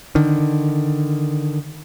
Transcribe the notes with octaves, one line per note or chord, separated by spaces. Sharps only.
D3 D#3